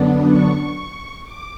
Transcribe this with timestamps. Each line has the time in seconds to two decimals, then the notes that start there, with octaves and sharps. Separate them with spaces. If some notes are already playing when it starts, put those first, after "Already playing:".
Already playing: F#2 D3 F#3 B3 D4
0.27 C#6
1.24 D6